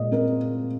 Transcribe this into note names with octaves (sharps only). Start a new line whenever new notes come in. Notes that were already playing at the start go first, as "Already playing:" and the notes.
Already playing: A#2 G#3 D#5
C4 A#4